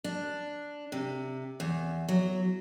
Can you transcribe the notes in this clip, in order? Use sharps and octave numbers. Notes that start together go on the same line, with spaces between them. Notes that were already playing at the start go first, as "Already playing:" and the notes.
D4
C3
E2
F#3